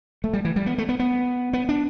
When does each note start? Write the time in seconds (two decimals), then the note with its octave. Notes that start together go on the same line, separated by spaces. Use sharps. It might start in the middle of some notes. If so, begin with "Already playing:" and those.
0.24 A3
0.33 G3
0.45 E3
0.56 G3
0.66 B3
0.78 A3
0.89 B3
0.99 B3
1.53 B3
1.69 D4